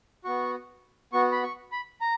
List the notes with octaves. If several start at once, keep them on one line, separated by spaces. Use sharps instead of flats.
B3 F#4 C#6
B3 F#4 C#6
B5
C#6
B5
A#5